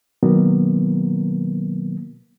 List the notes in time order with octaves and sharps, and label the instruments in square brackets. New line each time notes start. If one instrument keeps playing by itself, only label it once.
[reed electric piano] B2 D#3 F#3 A#3 B3